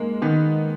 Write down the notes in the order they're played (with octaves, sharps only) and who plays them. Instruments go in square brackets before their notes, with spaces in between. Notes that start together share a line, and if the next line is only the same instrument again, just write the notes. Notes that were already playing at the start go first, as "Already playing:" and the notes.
Already playing: [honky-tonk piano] G#3 A#3
[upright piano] D#3 [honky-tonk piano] B3